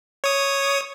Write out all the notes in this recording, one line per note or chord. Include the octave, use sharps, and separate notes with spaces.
C#5 D#6